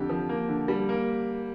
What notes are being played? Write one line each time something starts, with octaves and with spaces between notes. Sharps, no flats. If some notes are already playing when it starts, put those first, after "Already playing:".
Already playing: F2 D3 G4
F3
A#3
D3
G3
A#3